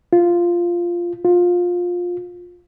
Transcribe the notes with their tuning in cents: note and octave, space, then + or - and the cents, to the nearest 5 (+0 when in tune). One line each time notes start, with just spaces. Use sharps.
F4 -5
F4 +20